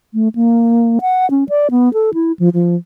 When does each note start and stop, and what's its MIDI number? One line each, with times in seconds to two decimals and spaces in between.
0.14 0.28 57
0.35 0.99 58
1.01 1.29 78
1.31 1.44 61
1.49 1.68 74
1.71 1.92 59
1.94 2.14 69
2.14 2.32 64
2.39 2.49 53
2.54 2.76 53